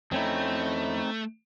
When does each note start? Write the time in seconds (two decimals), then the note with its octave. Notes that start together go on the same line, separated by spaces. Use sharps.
0.12 F2 A3 C4 C#4 D#4 E4